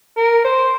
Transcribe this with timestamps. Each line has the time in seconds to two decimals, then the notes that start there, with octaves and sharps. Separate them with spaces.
0.17 A#4
0.45 C5